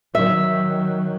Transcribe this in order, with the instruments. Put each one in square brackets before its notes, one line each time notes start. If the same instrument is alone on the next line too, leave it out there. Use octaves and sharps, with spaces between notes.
[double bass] D#3 F#3 [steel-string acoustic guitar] E5